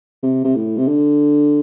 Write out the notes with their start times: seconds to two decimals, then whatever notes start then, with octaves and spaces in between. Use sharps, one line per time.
0.23 C3
0.44 C3
0.55 A2
0.77 C3
0.87 D3